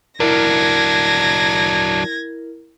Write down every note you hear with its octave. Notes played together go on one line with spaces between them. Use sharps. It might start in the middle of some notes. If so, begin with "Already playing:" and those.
F#3 D4 E4 A#4 G#6 A#6